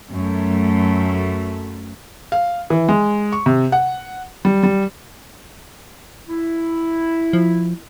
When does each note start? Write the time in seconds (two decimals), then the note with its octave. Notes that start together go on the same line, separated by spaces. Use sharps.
0.12 F#2 A3
2.32 F5
2.70 E3
2.89 G#3
3.32 C#6
3.46 C3
3.72 F#5
4.45 G3
4.63 G3
6.28 E4
7.33 F3